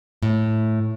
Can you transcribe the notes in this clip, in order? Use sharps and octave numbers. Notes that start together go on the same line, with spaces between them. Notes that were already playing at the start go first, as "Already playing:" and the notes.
A2